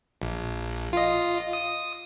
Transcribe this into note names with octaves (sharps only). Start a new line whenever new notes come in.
A#1
F4 D#5
D#6